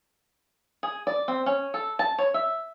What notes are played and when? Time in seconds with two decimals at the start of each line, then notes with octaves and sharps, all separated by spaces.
0.83 G#4
1.07 D5
1.28 C4
1.46 C#4
1.74 A4
1.99 A5
2.18 C#5
2.34 E5